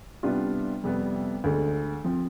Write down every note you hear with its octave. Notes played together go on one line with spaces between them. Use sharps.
C3 G3 B3 D4 F4
F2 C3 G3 B3
D2 D3 G#3
F3 C4